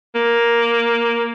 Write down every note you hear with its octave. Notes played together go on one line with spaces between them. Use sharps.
A#3